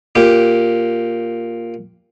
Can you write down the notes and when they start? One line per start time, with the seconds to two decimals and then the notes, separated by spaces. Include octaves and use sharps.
0.15 A#2 G4